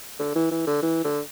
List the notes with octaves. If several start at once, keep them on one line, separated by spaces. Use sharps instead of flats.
D3
E3
E3
D3
E3
D3